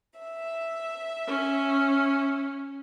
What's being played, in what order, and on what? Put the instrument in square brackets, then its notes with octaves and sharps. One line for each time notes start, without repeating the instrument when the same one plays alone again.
[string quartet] E5
[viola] C#4